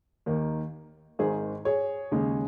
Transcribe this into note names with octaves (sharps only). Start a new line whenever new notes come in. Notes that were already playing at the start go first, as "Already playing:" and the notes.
D#2 D#3 A#3
G#1 G#2 D#3 G#4
G#4 C#5
D#2 C#3 G#3